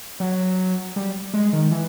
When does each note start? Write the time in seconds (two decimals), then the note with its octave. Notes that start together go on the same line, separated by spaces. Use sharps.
0.20 F#3
0.96 G3
1.34 G#3
1.53 D#3
1.71 E3